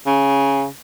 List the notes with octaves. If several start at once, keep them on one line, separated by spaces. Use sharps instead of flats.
C#3